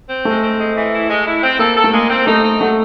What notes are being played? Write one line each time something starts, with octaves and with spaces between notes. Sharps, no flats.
C4
G#3 A3
C4
G#3
E3
E4
G#3
E4
C4
A#3 A4
A4
A3
G#3 A#3
C4
A3 D#4
D#4
F#3 A3